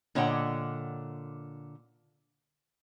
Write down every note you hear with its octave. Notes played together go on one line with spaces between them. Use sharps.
A#2 D3 C#5 D#5 F#5 G5